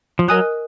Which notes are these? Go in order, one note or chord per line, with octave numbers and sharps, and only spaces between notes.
F3
F#3 A#4 D#5 G#5 D#6 F#6